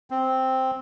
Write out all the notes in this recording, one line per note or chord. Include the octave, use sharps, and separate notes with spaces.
C4